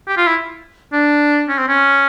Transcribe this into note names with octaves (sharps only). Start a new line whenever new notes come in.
G4
F4
E4
D4
C#4
C4
C#4